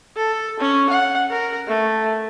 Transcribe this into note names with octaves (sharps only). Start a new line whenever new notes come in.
A4
C#4
F#5
A#4
A3